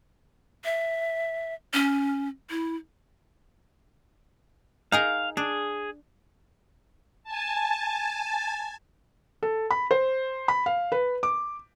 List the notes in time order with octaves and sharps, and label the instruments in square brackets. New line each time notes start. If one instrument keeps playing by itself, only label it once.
[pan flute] E5
C#4
E4
[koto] D#4 G#4 A#4 [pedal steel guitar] F5
[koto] D4 [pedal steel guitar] G#4
[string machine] G#5 A5
[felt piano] A4
B5
C5
B5
F5
B4
D6